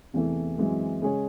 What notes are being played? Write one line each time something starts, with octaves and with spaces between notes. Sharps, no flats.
E2 C3 E3 A3
F#2 E3 G#3 C4
C#3 G#3 C#4 G#4 C#5